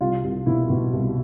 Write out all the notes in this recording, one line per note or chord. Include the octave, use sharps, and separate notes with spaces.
C2 F4
C2
B2 E4
B2
C2